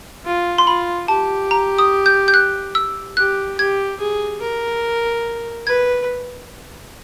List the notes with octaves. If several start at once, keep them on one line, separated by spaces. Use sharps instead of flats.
F4
C6
F4 B5
G4 A5
A#5
D#6
G6
G6
F#6
E6
G4 F#6
G4 G#6
G#4
A#4
B4 G#6